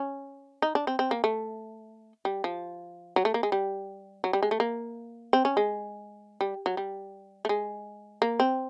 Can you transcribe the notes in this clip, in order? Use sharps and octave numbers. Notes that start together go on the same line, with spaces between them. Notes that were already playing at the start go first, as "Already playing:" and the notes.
Already playing: C#4
D#4
D4
C4
C4
A#3
A3
G3
F3
F#3
A3
A#3
G#3
G3
F#3
G3
G#3
A3
A#3
C4
C#4
G#3
G3
F#3
G3
A3
G#3
A#3
C4